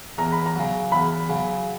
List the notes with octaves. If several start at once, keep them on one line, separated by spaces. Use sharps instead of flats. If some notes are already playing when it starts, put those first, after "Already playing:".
E2 A#5
B5
A#5
C#3 F#3
E2 B5
C#3 F#3